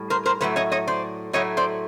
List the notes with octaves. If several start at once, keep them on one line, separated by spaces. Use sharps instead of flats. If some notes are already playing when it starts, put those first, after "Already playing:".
Already playing: A2 G3
A#4 C5
A#4 C5
A2 F#3 A3 B4 C#5
C#5 D#5
C#5 D#5
C5 D5
A2 F#3 A3 C#5 D#5
C5 D5